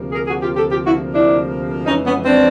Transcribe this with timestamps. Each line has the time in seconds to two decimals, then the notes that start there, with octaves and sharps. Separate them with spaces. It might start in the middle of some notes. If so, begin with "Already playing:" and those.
Already playing: D2 C3 F3 A#3
0.12 G#4 A#4
0.27 F#4 G#4
0.42 F4 G4
0.56 G4 A4
0.71 F4 G4
0.85 E4 F#4
1.14 D4 E4
1.86 F2 C#3 E3 G#3 C#4 D#4
2.05 B3 C#4
2.25 C4 D4